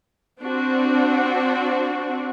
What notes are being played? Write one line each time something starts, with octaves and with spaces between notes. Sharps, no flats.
C4 D4 F#4